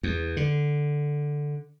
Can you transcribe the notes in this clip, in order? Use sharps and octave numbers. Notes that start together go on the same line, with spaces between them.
E2
D3